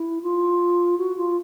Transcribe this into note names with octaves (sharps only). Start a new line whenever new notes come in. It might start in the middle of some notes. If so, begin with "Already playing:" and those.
Already playing: E4
F4
F#4
F4